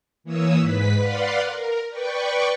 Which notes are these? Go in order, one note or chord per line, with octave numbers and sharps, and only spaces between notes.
E3 A#3 C#5 D#6 E6
G#2 B4 B6
B4 D5 F5 F#5 C6
A#4
B4 D5 G5 C#6